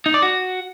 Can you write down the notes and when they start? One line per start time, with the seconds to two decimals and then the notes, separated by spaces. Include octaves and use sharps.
0.06 D#4
0.14 D5
0.22 F#4